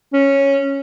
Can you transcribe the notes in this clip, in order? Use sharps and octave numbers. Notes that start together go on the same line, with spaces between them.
C#4